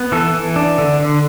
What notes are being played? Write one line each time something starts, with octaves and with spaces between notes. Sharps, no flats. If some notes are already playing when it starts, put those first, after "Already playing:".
Already playing: B3
E3 A4
E3
D4
D3
D3